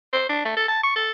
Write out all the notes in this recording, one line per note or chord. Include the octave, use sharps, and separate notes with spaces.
C5
D4
A3
A4
A5
C#6
A4